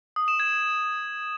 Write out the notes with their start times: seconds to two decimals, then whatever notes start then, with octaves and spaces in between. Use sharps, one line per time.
0.16 D#6
0.28 E7
0.40 G#6